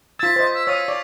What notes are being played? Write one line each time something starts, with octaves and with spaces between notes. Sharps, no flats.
F4 E6 G#6 A6 B6
C5 D#5
E6
C#5 F5 D#6 E6 A6 D#7
D5 C#6